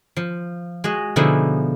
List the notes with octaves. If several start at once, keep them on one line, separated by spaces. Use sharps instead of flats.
F3
G#3 F#4 D#5
B2 D3 F3 D#4 E4 G#4